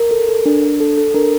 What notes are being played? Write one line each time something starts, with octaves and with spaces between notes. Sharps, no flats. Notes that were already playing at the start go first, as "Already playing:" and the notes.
Already playing: A#4
A4
A4
D4
D4
A4
A4
D4 A#4